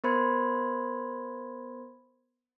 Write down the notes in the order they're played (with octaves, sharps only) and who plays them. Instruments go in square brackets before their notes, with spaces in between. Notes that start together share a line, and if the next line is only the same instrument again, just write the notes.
[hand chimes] B3 A#4 C5 B5 C6 G#6